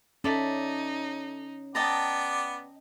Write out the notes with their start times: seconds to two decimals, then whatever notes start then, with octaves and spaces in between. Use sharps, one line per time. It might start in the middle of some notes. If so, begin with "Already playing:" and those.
0.24 C#4 D#4 A4 D5 E5
1.75 B3 D5 D#5 G5 A5 A#5